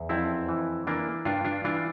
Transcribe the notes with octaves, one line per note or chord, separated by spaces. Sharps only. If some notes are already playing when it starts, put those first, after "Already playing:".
Already playing: E2
F2 C4 E4
E3
E3 A#3 D4
G2 D4 F4
D4 F4
E3 D4 F4